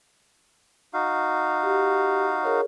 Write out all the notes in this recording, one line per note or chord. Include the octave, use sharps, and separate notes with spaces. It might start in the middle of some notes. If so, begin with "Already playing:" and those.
D#4 F#4 F5
G4
G#4 A#4 C#5